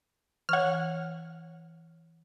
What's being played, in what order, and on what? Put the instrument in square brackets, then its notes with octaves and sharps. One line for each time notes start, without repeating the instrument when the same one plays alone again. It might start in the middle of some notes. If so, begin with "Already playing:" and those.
[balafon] E3 C#5 [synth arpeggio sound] F#5 F6